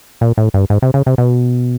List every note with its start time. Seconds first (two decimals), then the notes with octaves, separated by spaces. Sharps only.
0.21 A#2
0.38 A2
0.54 G2
0.70 G#2
0.82 C3
0.94 C#3
1.06 C3
1.18 B2